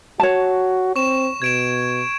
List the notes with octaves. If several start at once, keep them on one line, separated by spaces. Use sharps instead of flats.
F#4 C#5 A5
C4 C#6 E7
B2 G#6 D7 E7